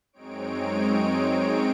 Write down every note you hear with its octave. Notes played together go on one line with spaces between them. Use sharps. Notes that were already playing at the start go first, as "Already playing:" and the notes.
F#2 G#3 C4 D#4 C#5 D7